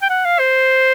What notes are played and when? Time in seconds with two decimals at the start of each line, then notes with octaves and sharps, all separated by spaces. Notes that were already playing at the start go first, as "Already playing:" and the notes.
0.02 G5
0.10 F#5
0.25 F5
0.39 C5